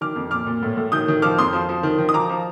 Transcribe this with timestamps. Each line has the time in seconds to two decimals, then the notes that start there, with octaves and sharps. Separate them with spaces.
0.01 D#3 D6 F6
0.16 F2
0.31 A#2 D6 F6
0.47 A#2
0.63 A2
0.77 A2
0.92 D#3 D#6 G6
1.08 D#3
1.22 F3 D6 F6
1.38 F2 C6 D#6
1.53 F3
1.69 F3
1.83 D#3
1.99 D#3
2.09 D#6
2.14 F3 A#5 D6
2.29 F3